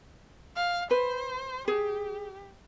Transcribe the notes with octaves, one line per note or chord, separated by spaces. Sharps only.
F5
B4 C5
G4 G#4